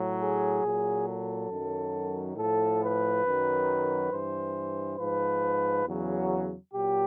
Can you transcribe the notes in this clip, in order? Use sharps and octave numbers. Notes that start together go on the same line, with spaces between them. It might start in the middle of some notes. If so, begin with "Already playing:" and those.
Already playing: A2 F#3
G#4
A#2 F#3
A4
F#2 D#3 F#3
A2 F3 A4
B4
F#2 D#3 F#3
G2 E3 C5
G#2 F3 B4
E2 C#3 F#3
A#2 F#3 G4